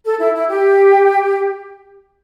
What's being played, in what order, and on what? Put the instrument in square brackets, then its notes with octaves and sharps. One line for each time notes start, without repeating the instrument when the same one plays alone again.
[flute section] A4
E4
E4
G4